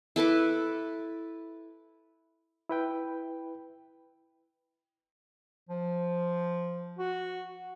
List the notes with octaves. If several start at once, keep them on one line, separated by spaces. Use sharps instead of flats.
E4 A4 B4 D6
E4 B4 G5
F3
F#4